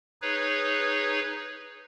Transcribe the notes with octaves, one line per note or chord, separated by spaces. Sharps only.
D#4 G#4 B4 C#5